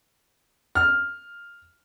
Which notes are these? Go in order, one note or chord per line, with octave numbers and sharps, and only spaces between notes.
F6